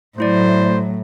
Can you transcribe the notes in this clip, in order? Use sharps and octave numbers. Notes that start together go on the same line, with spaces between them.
A2 F#3 A3 E4 C5 D5